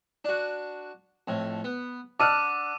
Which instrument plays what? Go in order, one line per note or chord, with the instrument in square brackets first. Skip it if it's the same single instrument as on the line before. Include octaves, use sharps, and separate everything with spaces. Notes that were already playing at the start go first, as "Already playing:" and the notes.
[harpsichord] D4 F#4
F2 A2
B3
[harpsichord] D4 F#5 [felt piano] A5 E6 F6 [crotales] D6 D#7